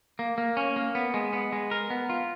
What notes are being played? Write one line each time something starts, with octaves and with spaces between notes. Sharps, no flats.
A#3
A#3
C#4
A#3
B3
G#3
B3
G#3
A#4
B3
F4